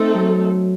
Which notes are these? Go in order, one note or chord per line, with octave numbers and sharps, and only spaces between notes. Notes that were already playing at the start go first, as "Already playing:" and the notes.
Already playing: A3 C4 D#4 A4
F#3